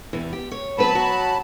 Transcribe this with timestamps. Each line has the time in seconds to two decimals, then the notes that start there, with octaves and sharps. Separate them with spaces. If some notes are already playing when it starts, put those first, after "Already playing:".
0.13 E2 C3 E3
0.33 G4
0.51 C#5
0.78 F#3 B3 C4 B4 A5 B5
0.95 F#4